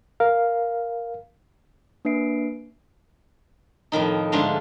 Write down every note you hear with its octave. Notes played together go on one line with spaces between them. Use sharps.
A#4 F5
A#3 D4 B4 E5 C7 D7
F2 A2 D#3 D#4
G#2 D3 A3 F4 F5